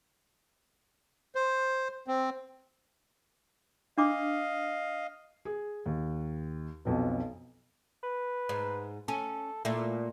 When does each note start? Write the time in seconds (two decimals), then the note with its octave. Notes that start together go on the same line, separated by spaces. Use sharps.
1.35 C5
2.07 C4
3.98 D4 D#5 F5 D6
5.45 G#4
5.86 D#2
6.85 B1 F2 B2
8.03 B4
8.49 G#2
9.08 C#4 A4
9.65 A#2 A3 E4